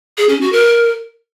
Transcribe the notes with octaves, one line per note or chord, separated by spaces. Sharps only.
G#4
C#4
F#4
A#4